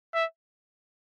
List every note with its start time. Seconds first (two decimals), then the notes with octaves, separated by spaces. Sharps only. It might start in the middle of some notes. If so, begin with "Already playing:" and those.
0.14 E5